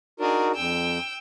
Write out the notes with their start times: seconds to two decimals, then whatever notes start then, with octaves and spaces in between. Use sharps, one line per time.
0.20 D4 D#4 F#4 G#4 A#4
0.55 F2 G5 E6